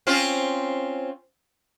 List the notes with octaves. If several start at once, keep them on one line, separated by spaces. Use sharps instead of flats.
C4 C#4 F4